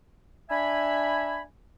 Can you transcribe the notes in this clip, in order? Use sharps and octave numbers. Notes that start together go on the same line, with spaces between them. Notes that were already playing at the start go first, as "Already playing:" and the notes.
D4 E5 G#5 B5